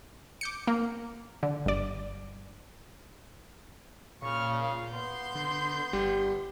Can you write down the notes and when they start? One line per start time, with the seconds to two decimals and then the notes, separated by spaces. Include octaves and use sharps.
0.41 D6 G6 C#7
0.67 A#3
1.43 D3
1.66 G1 D5
4.23 A#2 C#3 C#6 F6
4.60 F5
4.91 B3 C6 G6
5.35 D3
5.93 G1 G3